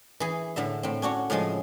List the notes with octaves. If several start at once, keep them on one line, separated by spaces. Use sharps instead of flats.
E3 G#4
A2 D3 E5
A2 C4
C#4 D4 F#4 C#5
A2 C#3 F3 G#3 G#5